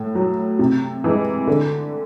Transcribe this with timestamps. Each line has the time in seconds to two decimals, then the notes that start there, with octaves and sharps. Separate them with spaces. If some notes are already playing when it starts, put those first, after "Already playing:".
Already playing: A2
0.15 F#3
0.59 C3
1.04 E3 G#3
1.47 D3